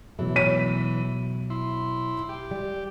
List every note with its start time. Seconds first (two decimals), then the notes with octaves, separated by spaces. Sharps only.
0.19 B2 E3 F#3 A3
0.36 C#5 B6 D#7
1.50 E4 C6
2.29 G4
2.51 G3